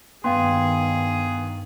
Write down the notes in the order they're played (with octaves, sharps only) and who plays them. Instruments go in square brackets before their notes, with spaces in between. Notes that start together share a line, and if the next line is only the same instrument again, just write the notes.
[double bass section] G2 D#3 [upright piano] B3 [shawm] G#4 [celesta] F5 G5 C6